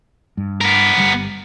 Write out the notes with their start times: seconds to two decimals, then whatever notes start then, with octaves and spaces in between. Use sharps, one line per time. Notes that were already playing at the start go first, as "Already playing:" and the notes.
0.37 G2
0.61 B3 A#4
0.96 G1 D3 G3